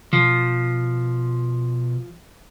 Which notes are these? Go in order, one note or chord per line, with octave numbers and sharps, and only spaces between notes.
B2 F3